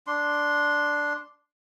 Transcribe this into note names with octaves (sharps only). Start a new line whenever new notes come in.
D4 C6